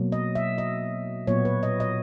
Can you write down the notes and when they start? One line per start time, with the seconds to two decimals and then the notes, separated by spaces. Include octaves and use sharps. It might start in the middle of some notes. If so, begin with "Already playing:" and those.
Already playing: B2 F#3 A#3
0.12 D#5
0.35 E5
0.58 D#5
1.27 A#2 F#3 B3 C#5
1.45 B4
1.63 D#5
1.80 D#5